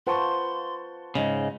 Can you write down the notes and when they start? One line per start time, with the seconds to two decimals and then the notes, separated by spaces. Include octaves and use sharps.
0.07 F4 B4 C5 F#5 A5 C6 C#6
1.15 G#2 C#3 D#5